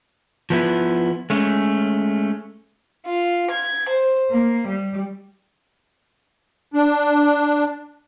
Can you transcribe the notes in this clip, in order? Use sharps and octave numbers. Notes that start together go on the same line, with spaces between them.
F3 B3 E4
G#3 A3 C#4
F4
G#6
C5
A#3
G3
D4